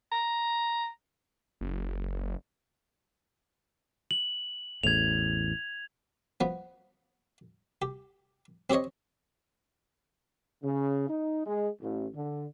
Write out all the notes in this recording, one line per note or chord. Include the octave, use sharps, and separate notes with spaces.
A#5
F#1
F#7
A1 E2 A2 G#6 F7
F3 B3
G4
C4 G4 C5 C#5 D#5
C#3
D#4
G#3
A1
D3